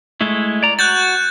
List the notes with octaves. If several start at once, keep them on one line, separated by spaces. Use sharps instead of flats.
G#3 A3 E4
D5 A#5
F#4 F#6 G6 A6